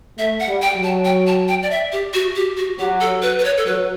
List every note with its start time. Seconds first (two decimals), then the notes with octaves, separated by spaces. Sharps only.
0.18 A3 E5
0.40 F#5
0.48 G3
0.62 G5
0.76 F#3
0.84 A5
1.05 G5
1.27 A5
1.48 G5
1.63 D5
1.71 E5
1.92 G4
2.14 F#4
2.36 G4
2.57 F#4
2.79 F#3 G4
3.01 A4
3.22 B4
3.39 B4
3.44 C#5
3.57 A4
3.66 F#3 B4